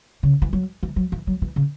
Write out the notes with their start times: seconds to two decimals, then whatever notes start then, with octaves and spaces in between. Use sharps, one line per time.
0.23 C#3
0.42 E3
0.53 F#3
0.83 E3
0.96 F#3
1.12 E3
1.27 F#3
1.42 E3
1.56 C#3